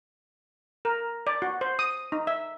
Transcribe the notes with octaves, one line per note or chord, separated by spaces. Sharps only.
A#4
D5
F#4
C5
D#6
D#4
E5